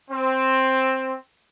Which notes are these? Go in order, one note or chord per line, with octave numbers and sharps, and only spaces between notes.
C4